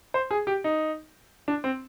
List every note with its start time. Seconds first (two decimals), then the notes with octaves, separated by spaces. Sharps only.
0.14 C5
0.31 G#4
0.47 G4
0.64 D#4
1.48 D4
1.64 C4